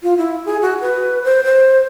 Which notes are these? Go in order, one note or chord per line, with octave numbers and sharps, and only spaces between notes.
F4
E4
G#4
F#4
B4
C5
C5